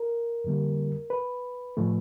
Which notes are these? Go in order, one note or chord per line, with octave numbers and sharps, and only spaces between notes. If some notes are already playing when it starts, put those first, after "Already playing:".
Already playing: A#4
F2 D3 G3 A#3
B4
A2 F3 A3